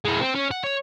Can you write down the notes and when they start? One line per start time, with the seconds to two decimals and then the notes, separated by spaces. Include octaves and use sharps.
0.05 G#3 E4
0.20 C4
0.35 C#4
0.51 F#5
0.64 C#5